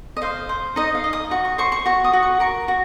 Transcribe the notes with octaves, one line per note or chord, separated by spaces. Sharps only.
D#5
C5 F5
C5
D#4 D#5
F5
D#5
D#6
F#4 C#6
C#6
C5 C#6
C#6
F#4 C#6
D#6
F#4
C#6
A#4 C#6
F#4